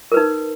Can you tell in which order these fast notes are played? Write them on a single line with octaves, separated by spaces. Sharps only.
A#4 B4 D#4